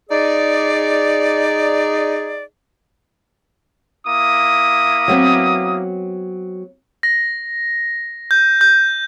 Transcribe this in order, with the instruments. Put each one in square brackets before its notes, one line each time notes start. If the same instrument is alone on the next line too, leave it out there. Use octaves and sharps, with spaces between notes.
[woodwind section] D#4 G#4 D5
[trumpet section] A#3 E4 D#6
[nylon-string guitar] F#3 B3 C4
[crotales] A#6
G6
G6